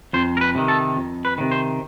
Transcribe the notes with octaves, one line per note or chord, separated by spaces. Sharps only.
F2 C5
A#4
B4
C3 D#3
A4
F2
B4
C3 D#3
C5